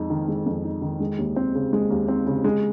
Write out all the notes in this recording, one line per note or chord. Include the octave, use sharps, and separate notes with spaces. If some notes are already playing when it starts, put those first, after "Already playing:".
Already playing: F2 G#3 D#4
D#3
G#3
F2
D#4
D#3
G#3
D#2
C4
C#3
G#3
D#2
C4
C#3
G#3